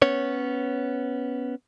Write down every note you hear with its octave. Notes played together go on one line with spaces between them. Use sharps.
B3 C#4 C#5